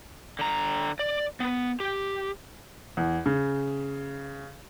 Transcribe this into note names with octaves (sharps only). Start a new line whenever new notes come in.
D3 A#5
D5
B3
G4
E2
C#3